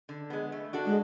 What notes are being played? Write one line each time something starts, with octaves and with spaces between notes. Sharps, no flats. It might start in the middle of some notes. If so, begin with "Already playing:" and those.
D3
G#3 B3
A3
D4 F#4 A4
G#3